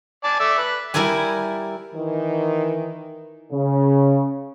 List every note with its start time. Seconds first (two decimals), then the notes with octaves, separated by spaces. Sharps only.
0.24 D5 G#5 A5
0.40 A3 D5 E5
0.58 B4
0.94 G3 E4 A#4 D5 G#5
1.93 D#3 E3
3.52 C#3